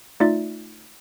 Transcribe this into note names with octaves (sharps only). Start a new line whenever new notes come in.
A3 D#4 F4 D5 E5 A6